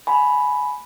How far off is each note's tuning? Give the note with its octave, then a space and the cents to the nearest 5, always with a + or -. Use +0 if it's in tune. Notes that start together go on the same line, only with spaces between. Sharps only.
G#5 +20 B5 +0